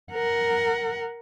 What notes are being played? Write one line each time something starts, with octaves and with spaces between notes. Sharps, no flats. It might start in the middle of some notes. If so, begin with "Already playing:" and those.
A#4 F#5